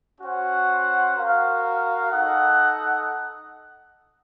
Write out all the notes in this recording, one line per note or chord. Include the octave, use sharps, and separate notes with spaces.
C#4 F#4 C5 F#5
F#4 A#4 F5
D#4 A4 D#5 F#5